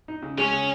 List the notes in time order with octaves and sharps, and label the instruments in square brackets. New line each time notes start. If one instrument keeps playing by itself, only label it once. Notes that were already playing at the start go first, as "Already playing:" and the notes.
[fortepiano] D#4
C#3
[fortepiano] G#3 [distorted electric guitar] C#4
[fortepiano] C#3